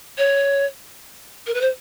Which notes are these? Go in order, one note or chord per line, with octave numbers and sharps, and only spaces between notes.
C#5
A#4
B4
C5